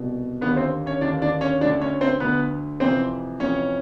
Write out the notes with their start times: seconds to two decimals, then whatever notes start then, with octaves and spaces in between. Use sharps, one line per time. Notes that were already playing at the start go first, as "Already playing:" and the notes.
Already playing: C2 B2
0.41 D#2 D3 B3 B4
0.56 C4 C5
0.86 C#4 C#5
1.01 D#2 D3 D4 D5
1.22 D4 D5
1.41 C#4 C#5
1.61 D2 D4 D5
1.65 D3
1.81 C#4 C#5
2.01 C4 C5
2.20 D2 D3 B3 B4
2.80 F2 C3 E3 C4 C5
3.40 F2 C3 E3 C#4 C#5